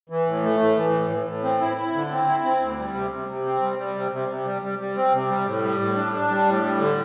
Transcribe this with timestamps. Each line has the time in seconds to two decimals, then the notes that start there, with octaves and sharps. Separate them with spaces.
0.10 E3
0.26 A2
0.43 A3
0.60 A2
0.76 E3
0.93 A2
1.10 A2
1.26 A2
1.43 C4
1.61 E4
1.77 E4
1.94 D3
2.11 C4
2.27 E4
2.44 C4
2.61 D2
2.77 G3
2.95 C3
3.11 C3
3.28 C3
3.45 C4
3.61 G3
3.78 G3
3.95 C3
4.12 C3
4.29 C3
4.45 G3
4.62 G3
4.79 G3
4.96 C4
5.12 C3
5.29 G3
5.46 A2
5.63 G3
5.80 A2
5.96 D4
6.13 D4
6.30 G3
6.46 A2
6.63 G3
6.79 D3